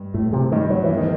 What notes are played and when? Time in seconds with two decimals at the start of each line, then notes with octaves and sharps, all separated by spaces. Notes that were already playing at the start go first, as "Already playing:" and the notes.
Already playing: G2
0.14 A2 A3
0.33 C3
0.52 G2 D#3
0.70 F#3
0.84 E3
0.89 E2
0.97 D#3